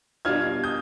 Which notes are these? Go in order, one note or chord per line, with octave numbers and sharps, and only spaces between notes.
B2 G3 D4 F4 F6 G#6
D#6 G6